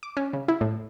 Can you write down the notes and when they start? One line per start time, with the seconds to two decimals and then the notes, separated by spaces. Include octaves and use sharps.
0.03 D6
0.17 C#4
0.33 C#3
0.48 E4
0.61 A2